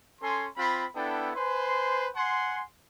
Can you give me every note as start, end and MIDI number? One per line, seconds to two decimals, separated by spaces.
0.22 0.46 61
0.22 0.46 69
0.22 0.46 80
0.22 0.46 84
0.57 0.85 60
0.57 0.85 65
0.57 0.85 83
0.95 1.31 59
0.95 1.31 62
0.95 1.31 64
0.95 1.31 69
0.95 1.31 79
1.35 2.08 71
1.35 2.08 72
1.35 2.08 80
1.35 2.08 84
2.16 2.63 78
2.16 2.63 80
2.16 2.63 84